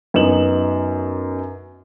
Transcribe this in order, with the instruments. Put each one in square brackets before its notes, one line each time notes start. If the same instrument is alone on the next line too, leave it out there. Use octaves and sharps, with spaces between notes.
[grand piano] F#2 B3 D#4 E7 F#7